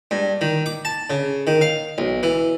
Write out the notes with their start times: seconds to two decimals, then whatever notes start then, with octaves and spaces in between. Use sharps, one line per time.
0.11 G2
0.41 D#3
0.66 D6
0.85 A5
1.10 C#3
1.47 D#3
1.61 F5
1.98 B1
2.23 E3